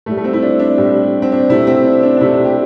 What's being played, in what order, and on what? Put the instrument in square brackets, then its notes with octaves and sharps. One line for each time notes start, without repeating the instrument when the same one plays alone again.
[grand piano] A2 G3 A3
A3
C4
E4
D4
D4
A2 G3
C4
D4
C3 A3 E4
C4
D4
D4
D4
C3 A3 E4
G4